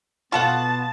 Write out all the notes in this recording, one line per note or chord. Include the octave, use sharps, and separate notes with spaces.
B2 B3 F4 A4 F5 F#5 A5 C6